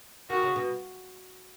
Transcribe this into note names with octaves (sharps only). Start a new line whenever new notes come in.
D#3 F#4
C#3
B2